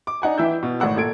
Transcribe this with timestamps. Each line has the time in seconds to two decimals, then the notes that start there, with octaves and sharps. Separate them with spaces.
0.07 D6
0.22 D4 D#4 F#5 G#5
0.38 E3 E4 G5 E6 G6
0.63 B2
0.80 G#1 A2 F#5 E6
0.96 A#2 A4 G#6 D7